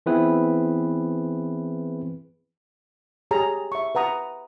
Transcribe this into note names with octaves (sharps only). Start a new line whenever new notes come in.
E3 B3 C4 E4 G#4 B4
G4 G#4 C#5 A#5
E5 C#6
B4 F#5 A#5 D#6